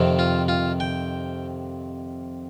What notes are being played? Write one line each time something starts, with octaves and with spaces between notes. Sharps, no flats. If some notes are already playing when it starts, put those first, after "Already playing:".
Already playing: F2 C3 D#3
F4
F4
G5